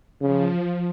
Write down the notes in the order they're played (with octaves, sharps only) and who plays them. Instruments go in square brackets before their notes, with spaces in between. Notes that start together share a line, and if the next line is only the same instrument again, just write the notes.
[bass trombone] C#3 [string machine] F3